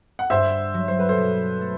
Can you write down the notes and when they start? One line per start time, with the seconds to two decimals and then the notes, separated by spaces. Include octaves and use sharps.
0.19 F#5
0.30 G2 C5 E5
0.74 F#3
0.88 C5
0.99 B4
1.09 A4 C5
1.17 B2
1.61 A3